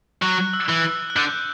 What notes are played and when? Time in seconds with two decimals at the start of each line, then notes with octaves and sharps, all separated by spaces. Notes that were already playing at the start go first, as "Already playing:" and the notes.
0.22 F#3 F#6
0.53 E6
0.69 E3
0.85 E6
1.10 F#6
1.16 D3 G6